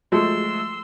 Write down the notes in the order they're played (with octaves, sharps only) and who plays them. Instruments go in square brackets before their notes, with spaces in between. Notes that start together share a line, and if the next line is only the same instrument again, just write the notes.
[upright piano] F3 G#3 A3 [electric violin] C6 E6